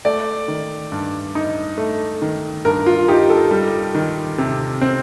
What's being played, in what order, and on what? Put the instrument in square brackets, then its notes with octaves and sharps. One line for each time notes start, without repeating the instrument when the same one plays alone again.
[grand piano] A3 [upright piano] D5
[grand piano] D#3
G2
D#4
A3
D#3
[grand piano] G2 [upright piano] A#4
[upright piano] F4
[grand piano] D#4 [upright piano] G4
[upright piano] A4
[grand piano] G3
D#3
C3
C4